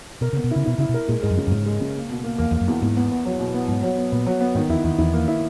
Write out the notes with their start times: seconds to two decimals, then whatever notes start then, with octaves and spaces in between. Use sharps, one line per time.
0.21 B2 A#4
0.33 C#3 B3
0.44 B2
0.51 C#3 E4
0.66 B2 E4
0.78 C#3 E4
0.89 B2
0.94 A#4
1.09 A#2 G#3
1.23 G#2 G#3
1.31 F#2
1.37 C#3
1.47 F#2
1.51 G#2 C#3
1.66 G#3
1.81 C#3
1.95 A#3
2.10 B2
2.24 A#3
2.38 E2 A#3
2.51 E2 A#3
2.61 F#2
2.68 E2
2.82 E2 G#2
2.97 B3
3.11 B3
3.25 F#3
3.40 B2
3.54 B3
3.68 G#2 F#3
3.83 F#3
3.97 B3
4.12 A#2 B3
4.26 F#3
4.41 B3
4.55 G#2 D#3
4.69 E2 E4
4.84 E2 D#3
4.98 E2 E4
5.13 A#3
5.28 E4